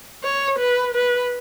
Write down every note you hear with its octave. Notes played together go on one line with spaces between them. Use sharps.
C#5
B4
B4